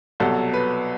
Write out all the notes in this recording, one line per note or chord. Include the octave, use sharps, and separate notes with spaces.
C2 B2 F#3 A4
B4